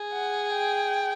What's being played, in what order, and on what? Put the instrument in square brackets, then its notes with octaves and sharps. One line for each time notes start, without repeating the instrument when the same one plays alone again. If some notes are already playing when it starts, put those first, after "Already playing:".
Already playing: [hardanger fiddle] G#4
[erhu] F#5
G5